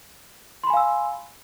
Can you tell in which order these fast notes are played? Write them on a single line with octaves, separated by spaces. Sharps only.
C6 B5 G#5 F5 E6